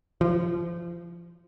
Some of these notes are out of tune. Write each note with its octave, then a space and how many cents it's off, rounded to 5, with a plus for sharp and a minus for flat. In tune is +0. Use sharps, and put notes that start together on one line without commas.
F3 -30